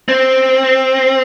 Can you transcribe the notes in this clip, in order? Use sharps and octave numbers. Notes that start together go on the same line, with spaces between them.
C4